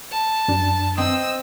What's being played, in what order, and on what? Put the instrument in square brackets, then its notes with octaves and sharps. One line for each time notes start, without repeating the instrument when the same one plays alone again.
[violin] A5
[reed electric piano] F#2 D4
[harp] C4 [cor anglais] D#5 [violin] E6